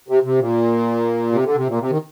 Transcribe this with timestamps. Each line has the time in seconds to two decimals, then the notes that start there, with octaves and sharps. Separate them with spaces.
0.08 C3
0.23 C3
0.39 A#2
1.32 C3
1.44 D3
1.56 C3
1.67 A#2
1.79 C3
1.90 D#3